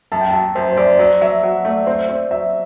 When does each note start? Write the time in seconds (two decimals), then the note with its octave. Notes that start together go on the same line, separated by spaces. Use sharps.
0.12 F#2 A5
0.21 G5
0.31 F#3 A5
0.55 F#2 C5
0.72 C5
0.77 F#2 D5
0.99 F#3 D5
1.21 F#3 E5
1.43 F#3 F#5
1.65 A3 D5
1.87 C4 C5
2.08 C4 D5
2.31 F#3 E5